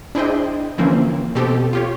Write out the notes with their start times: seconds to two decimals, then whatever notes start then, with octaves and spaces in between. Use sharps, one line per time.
0.15 D4 E4 G#4 C5 D#5 G5
0.78 D3 E3 F3 A#3 C4 C#4
1.35 B2 C4 G4 A4
1.73 F4 G4 C#5